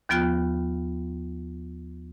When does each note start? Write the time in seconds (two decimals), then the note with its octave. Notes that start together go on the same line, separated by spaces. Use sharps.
0.09 D#2 F3 B3 F4 G5 F#6